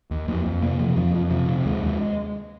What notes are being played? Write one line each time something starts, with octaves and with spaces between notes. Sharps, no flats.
D#2
F2 A#3
F2
C3 A#3
C3 F3
F2 F3
F2
C3 F3
C3
D#2 G#3
D#2